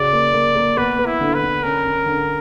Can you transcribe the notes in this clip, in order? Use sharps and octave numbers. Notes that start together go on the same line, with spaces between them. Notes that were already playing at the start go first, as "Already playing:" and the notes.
Already playing: C#3 F#4 D5
A#3
A#3
A#3
B3 B4
B3
E4
D3
B4
D3
C#4 A#4
C#4
D3